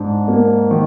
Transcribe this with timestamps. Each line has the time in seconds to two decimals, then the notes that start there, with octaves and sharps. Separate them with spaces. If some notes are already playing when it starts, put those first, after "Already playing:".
Already playing: G#2 D4
0.28 A#3
0.71 D#3